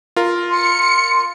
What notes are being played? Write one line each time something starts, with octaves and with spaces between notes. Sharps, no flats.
F4 A#4
C6 C#7